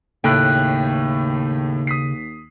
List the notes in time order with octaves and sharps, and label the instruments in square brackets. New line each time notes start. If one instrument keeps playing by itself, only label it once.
[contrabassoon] D#2 [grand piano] A2 A3 [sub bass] C#3 [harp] G5 F#6
[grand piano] D#6 B6 C7